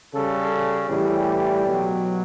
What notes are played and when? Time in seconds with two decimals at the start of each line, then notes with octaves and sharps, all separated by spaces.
0.13 C#3 G3 A4
0.89 A2 E3 G3 G4
1.67 B2 F#3